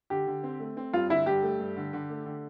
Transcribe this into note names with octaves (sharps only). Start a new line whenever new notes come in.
D3 G4
D3
C4
A3
C4
G2 F4
D3 E4
G2 G4
A3
G2
D3
D3
A3
D3